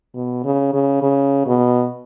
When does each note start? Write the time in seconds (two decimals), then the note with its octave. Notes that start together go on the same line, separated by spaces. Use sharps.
0.14 B2
0.45 C#3
0.73 C#3
1.03 C#3
1.46 B2